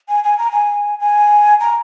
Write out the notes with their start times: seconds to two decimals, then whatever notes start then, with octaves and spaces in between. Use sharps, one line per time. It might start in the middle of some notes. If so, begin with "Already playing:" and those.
0.08 G#5
0.24 G#5
0.38 A#5
0.51 G#5
0.99 G#5
1.60 A#5